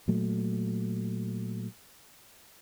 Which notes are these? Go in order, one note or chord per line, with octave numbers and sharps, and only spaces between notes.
A#2 F#3 A3